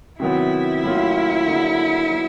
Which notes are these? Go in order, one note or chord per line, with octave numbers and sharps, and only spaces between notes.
C3 D#3 F#3 B3 E4
A2 F#3 A#3 C#4 F4
D3 F#3 A#3 D#4 G#4
F#3 B3 D#4